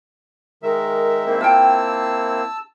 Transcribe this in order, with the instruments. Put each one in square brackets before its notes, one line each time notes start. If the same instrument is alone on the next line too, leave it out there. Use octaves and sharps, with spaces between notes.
[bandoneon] D#3 G#3 E5 [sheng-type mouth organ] A#4
[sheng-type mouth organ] A#3 C4 E4
[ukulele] F4 G5 [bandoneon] A5 E6